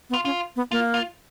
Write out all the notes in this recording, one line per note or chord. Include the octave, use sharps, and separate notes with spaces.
B3
F4
C#4 F4
B3
A#3 F4
F4